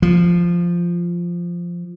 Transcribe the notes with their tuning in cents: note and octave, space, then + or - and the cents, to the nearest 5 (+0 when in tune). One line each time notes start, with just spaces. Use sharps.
F3 -5